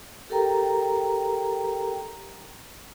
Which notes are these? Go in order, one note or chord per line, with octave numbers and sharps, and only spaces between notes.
G4 A4 A#4 G5 A#5